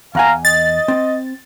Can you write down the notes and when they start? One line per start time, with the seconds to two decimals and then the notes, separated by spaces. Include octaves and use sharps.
0.15 E2 F5 F#5 G#5 A#5
0.45 D#5 A6
0.88 C4